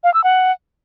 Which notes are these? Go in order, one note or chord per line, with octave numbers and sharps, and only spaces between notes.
F5
E6
F#5